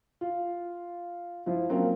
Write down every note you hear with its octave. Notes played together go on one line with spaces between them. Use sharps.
F4
F3 E4 F4
F#3 A#3 C4 C#4 F4 A#4